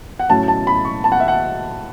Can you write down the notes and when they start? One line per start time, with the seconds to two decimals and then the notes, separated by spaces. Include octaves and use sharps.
0.19 F#5
0.30 A2 F#3 A3 C#4 A5
0.48 A5
0.67 B5
0.85 C#6
1.04 A5
1.12 F#5
1.20 E5
1.28 F#5